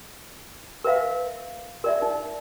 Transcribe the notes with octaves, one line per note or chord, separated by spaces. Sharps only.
A#4 B4 E5 F5
A#4 D5 E5
D#4